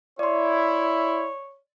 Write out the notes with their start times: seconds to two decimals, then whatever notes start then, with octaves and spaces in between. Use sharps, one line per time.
0.19 E4 C#5 D5 C6